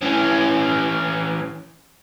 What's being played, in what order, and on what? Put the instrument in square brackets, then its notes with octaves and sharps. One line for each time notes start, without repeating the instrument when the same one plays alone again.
[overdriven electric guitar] E3 C#4